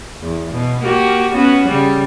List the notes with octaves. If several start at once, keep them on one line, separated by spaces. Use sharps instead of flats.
E2
B2
A#3 F#4 G4
B3 C#4 F#4
C#3 G3